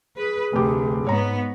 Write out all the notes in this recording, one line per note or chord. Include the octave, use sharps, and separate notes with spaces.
G#4 B4
F1 D2 G4
G#2 B3 C#5 A#5